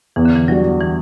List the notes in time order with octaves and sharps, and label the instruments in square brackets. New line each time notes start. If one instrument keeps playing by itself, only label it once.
[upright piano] E2 [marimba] E3
[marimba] D3
E3
[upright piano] D3 G3 D4 F#4 [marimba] F#3
[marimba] E3